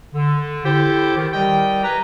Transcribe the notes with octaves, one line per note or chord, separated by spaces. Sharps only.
D3
E4 G4 A4 C5 G5
D#3
G3 G4 A#4 D#5 G5
B4 G#5 A#5